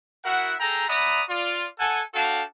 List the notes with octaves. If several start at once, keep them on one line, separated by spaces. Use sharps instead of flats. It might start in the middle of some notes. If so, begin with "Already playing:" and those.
E4 F#4 A#4 E5 F#5
G#4 A4 G5 A#5
D5 E5 F#5 A#5 B5 D#6
F4 D5
A4 F#5 G#5
D4 F#4 A4 F5 G5 A5